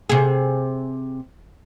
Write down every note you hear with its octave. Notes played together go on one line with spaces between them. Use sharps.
C3 G#4